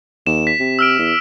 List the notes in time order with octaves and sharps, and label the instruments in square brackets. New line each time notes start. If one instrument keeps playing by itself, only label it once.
[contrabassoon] D#2 [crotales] E7
[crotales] B6
[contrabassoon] C3
[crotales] E6 F6 D7
[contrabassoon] E2